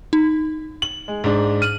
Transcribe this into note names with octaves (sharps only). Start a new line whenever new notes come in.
D#4
F#7
G#3
G#2 D4
F6 D#7 F#7